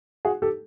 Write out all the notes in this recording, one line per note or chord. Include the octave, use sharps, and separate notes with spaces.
F#4 G#4
G4 A4